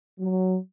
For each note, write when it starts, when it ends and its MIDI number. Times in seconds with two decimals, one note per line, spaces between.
0.20 0.57 54